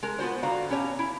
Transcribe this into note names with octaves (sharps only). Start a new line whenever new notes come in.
G#3 A#4
B3 F4 F#4 C5
D3 F#4 F5 A#5
B2 C#4 G4 C#5 A#5
E4